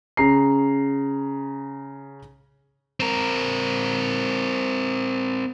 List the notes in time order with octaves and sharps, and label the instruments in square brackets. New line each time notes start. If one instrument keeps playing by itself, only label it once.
[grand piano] C#3 A#5 C7
[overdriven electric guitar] C4 A#4